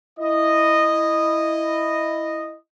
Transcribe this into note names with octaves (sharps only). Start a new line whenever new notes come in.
E4 D#5